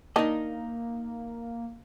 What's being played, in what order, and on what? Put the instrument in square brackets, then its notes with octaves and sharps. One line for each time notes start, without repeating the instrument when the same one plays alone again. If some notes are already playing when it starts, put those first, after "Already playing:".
[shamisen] D#3 D4 [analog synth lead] A#3 [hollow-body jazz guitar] D#4 A#4 D#5